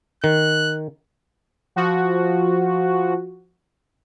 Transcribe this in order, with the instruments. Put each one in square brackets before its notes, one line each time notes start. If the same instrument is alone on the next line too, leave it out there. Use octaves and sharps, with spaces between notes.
[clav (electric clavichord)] D#3 [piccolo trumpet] F#6
[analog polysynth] F3 F#4